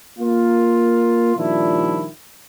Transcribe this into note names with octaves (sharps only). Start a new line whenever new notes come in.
A#3 F4
A#2 D#3 F3 G3 D4 E4